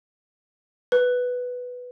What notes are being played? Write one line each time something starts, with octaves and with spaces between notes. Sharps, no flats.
B4